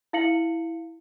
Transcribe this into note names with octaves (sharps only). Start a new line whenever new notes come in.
E4 F5 C#7 F#7